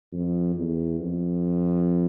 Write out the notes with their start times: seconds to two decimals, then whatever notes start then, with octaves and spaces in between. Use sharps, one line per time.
0.12 F2
0.55 E2
0.99 F2